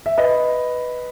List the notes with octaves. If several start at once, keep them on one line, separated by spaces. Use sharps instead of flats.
E5
B4 D#5